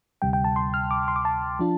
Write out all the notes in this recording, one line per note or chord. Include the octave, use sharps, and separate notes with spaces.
D2 C3 G3 G5
G5
A5
C6
F6
D6
C6
D6
A5
F3 D4 F4